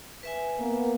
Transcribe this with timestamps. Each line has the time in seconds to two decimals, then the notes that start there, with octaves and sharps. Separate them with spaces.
0.23 B4 E5 G#5
0.60 A#3 B3